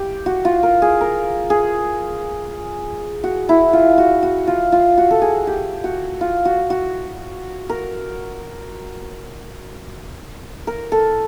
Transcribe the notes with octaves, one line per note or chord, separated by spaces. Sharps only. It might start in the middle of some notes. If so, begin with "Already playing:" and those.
Already playing: G4
F#4
F4
A#4
G#4
A#4
G#4
F#4
E4
F4
F#4
F#4
F4
F4
F#4
A4
G#4
G4
F#4
F4
F#4
F#4
A#4
A#4
A4